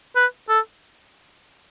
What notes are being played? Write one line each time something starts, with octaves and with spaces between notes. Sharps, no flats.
B4
A4